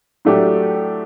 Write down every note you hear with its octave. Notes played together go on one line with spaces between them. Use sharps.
A2 F#3 A3 D4 G4